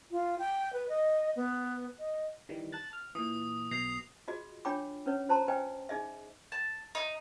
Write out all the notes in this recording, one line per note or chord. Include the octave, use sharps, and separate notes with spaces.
F4
G5
B4
D#5
B3
D#5
D#3 E3 G3
A5 F#6 A6
F6
A#2 E3 D#6
B1 B2 A#6 C7 F7
F4 F#4 G#4 D#5
D4 F4 C#5 G5 B5 D6
C#4 B4 C#5
F4 C5 A5 A#5 C6
B4 C5 D#5 G5 G#5
D#4 G#4 D#5 E5
A5
D#4